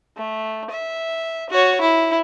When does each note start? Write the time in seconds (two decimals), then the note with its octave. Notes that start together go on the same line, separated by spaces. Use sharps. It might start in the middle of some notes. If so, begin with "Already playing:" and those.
0.17 A3
0.70 E5
1.50 F#4 C#5
1.81 E4